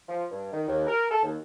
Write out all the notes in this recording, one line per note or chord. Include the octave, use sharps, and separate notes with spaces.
F3
G2
D#3
D#2
A#4
A4
D#2